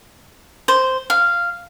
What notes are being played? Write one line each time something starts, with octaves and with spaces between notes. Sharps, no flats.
C5
F5